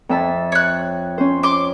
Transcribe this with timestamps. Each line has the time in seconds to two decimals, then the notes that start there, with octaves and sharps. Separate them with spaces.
0.09 F2 E5 A5
0.52 C#5 F#6
1.18 C#4 C5
1.43 C6 D6